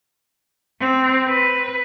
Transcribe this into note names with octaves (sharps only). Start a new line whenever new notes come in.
C4
B4